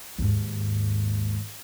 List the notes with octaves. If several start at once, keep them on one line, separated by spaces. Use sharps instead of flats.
D#2 G#2